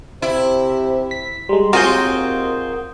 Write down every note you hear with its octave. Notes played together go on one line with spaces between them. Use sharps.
C3 E4
B6
G3 G#3 A#5 C6
D#2 C4 F4 F#4 G#4 A#4 D#6 G6